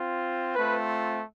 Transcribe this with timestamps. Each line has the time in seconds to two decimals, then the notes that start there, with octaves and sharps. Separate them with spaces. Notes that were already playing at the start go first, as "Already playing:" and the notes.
Already playing: C4 F4
0.56 A3 C4 F4 B4